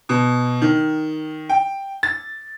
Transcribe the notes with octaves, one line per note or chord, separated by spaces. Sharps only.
B2
D#3
G5
A6